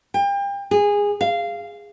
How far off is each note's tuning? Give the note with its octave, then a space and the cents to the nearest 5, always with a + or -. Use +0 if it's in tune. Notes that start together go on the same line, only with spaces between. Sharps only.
G5 +35
G#4 -20
F5 -15